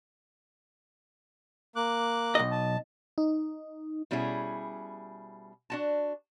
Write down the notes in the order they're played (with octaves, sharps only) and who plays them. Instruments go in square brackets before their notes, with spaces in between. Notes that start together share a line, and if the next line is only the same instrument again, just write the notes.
[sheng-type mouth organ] A#3 D6 F#6
[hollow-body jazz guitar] B1 D#5
[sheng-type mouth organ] A5
[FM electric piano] D#4
[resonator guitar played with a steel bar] B2 G3 C#4 E4 G#4
D4 F#4 A5